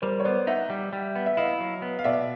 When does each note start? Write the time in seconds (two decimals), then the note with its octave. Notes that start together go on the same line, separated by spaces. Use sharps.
0.02 G3 A#4 C5
0.20 C#5
0.25 B3 C5 D5
0.47 D#4 E5 F#5
0.70 G3
0.93 G3
1.16 B3
1.26 E5
1.37 E4 D#5 F5
1.60 F#3
1.82 B3
1.99 F5
2.04 B2 D5 E5